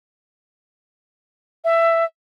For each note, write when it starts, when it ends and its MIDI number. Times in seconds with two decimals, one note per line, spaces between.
1.64 2.05 76